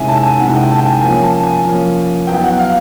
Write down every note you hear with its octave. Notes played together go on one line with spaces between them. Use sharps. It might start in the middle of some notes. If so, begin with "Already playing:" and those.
Already playing: C3 D#3 G#3 C#4 E4 E5 G#5
A5
G#5
C3 D#3 G#3 C#4 E4 F#5
G5
A5
G5
G#5
F3 A#3 C#4 G#5
A5
G#5
F3 A#3 C#4
F#3 B3 E4 G5
F#5
F5